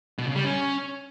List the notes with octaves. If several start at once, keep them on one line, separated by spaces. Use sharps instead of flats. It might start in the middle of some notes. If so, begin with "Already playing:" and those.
B2
C#3
G3
C#4